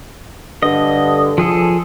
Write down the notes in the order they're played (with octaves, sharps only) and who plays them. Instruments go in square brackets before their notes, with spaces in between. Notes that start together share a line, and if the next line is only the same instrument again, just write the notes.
[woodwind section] G2 D3 [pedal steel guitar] D#5
[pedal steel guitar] F3 G#4 A4